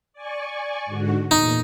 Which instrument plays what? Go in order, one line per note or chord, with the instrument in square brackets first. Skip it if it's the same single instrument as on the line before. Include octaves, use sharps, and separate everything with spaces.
[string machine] D5 G#5 C#6
G#2 D3 F#4
[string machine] E2 A#2 [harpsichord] D#4